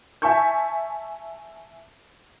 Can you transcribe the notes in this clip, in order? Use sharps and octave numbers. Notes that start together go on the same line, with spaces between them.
E5 G#5 A5 C#6 G6